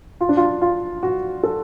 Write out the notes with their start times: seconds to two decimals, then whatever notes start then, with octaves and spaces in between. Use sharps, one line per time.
0.21 F4
0.29 D4
0.37 F4
0.62 F4
1.03 F#4
1.43 A4